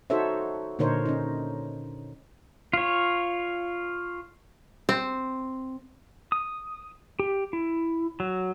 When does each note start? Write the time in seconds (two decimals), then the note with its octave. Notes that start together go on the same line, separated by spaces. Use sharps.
0.10 D#4 F#4 A4 C5 C#5 E5
0.79 A#2 D3 D#4 A#4 C5 C#5
1.05 C#4 D#4
2.73 F4 C#5
4.89 C4
6.32 D#6
7.19 G4
7.53 E4
8.20 F#3